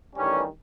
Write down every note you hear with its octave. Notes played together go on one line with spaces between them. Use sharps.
A1 G2 D#3 G3 C#4